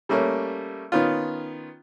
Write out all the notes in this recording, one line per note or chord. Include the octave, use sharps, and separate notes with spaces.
G3 A3 A#3 C#4
D#3 B3 C#4 F4